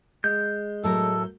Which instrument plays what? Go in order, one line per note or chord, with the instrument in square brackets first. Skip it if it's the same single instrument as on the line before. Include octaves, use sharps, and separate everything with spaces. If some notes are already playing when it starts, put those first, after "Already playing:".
[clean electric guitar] G#3 [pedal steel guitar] G6
[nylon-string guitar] A2 F#3 A#4 [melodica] A4